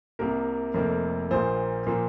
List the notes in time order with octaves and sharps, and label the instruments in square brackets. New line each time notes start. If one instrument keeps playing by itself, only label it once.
[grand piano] C2 C3 G3 A#3 A#4
F1 F2 C3 A#3
A#1 A#2 G3 A#3 C5
A#2 F3 A#3